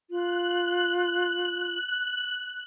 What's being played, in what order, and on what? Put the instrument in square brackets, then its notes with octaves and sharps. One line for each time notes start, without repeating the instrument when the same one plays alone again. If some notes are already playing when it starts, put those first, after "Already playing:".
[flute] F4 [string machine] F#6